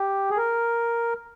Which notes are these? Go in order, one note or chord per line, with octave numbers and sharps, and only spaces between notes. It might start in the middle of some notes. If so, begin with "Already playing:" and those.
Already playing: G4
G#4
A#4